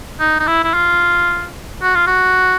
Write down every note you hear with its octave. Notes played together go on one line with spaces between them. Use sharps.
D#4
D#4
E4
E4
F4
F#4
F4
F#4